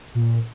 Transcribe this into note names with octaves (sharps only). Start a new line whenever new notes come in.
A#2